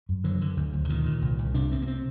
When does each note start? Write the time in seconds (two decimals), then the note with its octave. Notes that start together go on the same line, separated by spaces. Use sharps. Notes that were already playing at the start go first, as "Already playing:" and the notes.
0.09 F#2
0.24 D3 F#3
0.41 D3
0.57 D2
0.73 D2
0.85 D3
0.89 A#2 D#3
1.06 A#2
1.22 C2
1.39 C2
1.54 C3 D4
1.71 C3 C4
1.82 A#3
1.87 C4